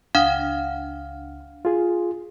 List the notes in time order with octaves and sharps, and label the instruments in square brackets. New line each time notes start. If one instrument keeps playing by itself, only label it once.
[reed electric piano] C#2 F6 [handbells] D4 F5 F#5
[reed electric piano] F4 G#4